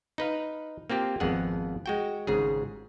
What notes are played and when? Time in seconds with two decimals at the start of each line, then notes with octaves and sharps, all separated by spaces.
0.18 D#4 B4 F5
0.90 A#3 C4 F4 G4
1.20 G#1 F2 B3 G#4 F#5
1.86 G#3 F#4 G5
2.27 G#1 G#2 C#3 G#4